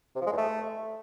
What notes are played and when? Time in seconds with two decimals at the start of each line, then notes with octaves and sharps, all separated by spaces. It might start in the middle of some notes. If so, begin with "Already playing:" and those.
0.16 C3
0.21 F3
0.27 G#3
0.32 E2
0.37 A3